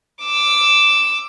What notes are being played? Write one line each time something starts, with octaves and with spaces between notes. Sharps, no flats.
D6 E6